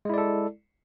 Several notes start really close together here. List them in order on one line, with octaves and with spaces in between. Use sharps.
G#3 E4 D5 A4